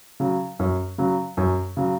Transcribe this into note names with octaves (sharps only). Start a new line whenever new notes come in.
C#3 F#3
F#2
C#3 F#3
F#2
C#3 F#3